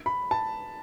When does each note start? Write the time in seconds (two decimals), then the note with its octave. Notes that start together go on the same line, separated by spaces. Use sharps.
0.06 B5
0.31 A5